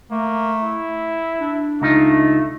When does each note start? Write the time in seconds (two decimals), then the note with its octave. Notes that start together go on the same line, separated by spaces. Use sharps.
0.11 A3 A#3
0.63 E4
1.40 D4
1.82 C#2 A3 D#4 F4